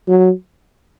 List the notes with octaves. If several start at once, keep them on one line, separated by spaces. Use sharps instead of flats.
F#3